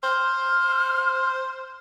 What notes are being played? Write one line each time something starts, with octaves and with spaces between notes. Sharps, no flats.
C5 F6